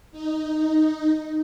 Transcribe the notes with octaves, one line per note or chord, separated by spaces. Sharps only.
D#4